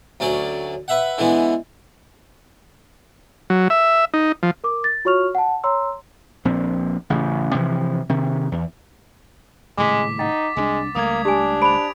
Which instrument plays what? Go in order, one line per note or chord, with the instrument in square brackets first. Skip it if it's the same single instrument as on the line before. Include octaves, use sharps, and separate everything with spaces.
[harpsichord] D2 F#3 C#4 D5
B4 E5 F#5
D3 E3 G#3 B3
[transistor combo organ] F#3
E5
D#4
F3
[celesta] A#4 D6
A6
F4 F#4 C#5 C#6 F6 F7
F#5 A5
C#5 A#5 C6 E6
[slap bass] A#1 C4
A1 C#3
C3 E3 F3
C3 D#3
E2
[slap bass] D#1 A2 C#3 [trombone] G#3 [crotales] D6 B6
[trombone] D#4 [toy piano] F#5 G5 [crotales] A6
[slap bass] C2 F3 D4 [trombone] G#3
[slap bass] C#2 G3 A3 [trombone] A#3 [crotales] D#6 G#6
[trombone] D4 [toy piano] G4 G#5
[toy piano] C5 B5 [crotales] D7 F7